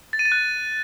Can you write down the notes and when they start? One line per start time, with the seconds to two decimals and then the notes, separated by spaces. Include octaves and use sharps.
0.13 A6
0.19 D#7
0.25 A6
0.32 F#6